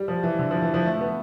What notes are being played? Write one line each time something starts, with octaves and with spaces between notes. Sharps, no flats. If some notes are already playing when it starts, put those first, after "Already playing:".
Already playing: G3
F3
E3
D3
F3
E3
F3
A3
B3